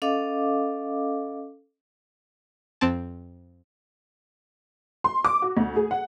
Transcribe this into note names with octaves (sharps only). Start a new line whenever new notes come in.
C#4 A4 D#5 F5 D6
F2 C4 A5
C6
D6
F#4
D2
G#4
F#5